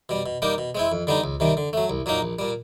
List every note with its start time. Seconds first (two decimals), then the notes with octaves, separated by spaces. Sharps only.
0.09 B2 G3
0.26 B2
0.42 G3 A#3 D#4 G4
0.58 B2
0.75 G#3 C4 E4
0.92 F2
1.07 D3 G3 B3 D#4
1.24 C#2
1.40 C3 D#3 G3
1.57 D3
1.73 F#3 A3
1.90 C2
2.06 A#2 F#3 A#3 D#4
2.22 A#1
2.39 A#2 G3